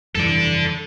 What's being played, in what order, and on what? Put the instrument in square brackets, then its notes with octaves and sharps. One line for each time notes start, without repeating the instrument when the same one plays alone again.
[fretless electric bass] F1 G2 E3 [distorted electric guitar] A4 D5